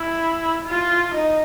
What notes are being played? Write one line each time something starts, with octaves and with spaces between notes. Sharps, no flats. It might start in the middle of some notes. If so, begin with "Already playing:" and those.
Already playing: E4
F4
D#4